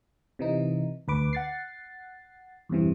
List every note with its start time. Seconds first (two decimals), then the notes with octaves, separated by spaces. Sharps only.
0.39 C3 E3 D#4
1.08 D2 B4 D6
1.33 F#5 A6 C7
2.69 E2 G2 C3 E3